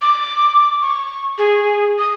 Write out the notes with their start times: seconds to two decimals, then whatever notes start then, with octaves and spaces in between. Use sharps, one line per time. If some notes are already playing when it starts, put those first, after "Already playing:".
0.02 D6
0.81 C#6
1.38 G#4
1.99 D#6